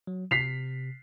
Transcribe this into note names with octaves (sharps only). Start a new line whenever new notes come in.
F#3
C3 B6 C7 F7